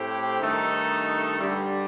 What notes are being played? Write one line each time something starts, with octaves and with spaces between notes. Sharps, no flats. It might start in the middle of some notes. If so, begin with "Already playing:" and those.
Already playing: A2 A3 C4 G4
G2 D#3 A3 D#4 A4
G2 D3 G3